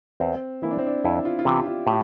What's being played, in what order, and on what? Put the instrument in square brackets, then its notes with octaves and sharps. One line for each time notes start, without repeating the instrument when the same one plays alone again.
[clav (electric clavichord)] E2 [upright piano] C4
[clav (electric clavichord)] E3 A#3 [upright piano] E4
[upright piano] D4
C4
D4
[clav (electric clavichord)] F2 [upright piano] E4
[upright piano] F4
F4
[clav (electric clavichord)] C3 E3 [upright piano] G4
[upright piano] F4
[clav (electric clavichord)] A2 [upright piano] G4